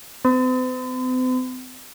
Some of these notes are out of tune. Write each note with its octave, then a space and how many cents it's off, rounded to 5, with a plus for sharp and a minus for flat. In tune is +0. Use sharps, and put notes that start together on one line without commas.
C4 -45